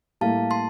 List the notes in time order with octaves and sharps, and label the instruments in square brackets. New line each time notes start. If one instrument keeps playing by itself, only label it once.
[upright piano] A2 G3 A#3 E4 [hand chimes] F5 A5
[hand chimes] A5 C6